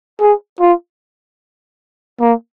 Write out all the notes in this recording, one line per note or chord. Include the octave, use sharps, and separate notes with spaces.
G#4
F4
A#3